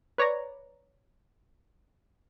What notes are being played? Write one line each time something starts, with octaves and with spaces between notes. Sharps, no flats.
B4 C#5 D5 A#5